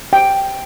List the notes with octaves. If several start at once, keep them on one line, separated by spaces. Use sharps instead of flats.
G5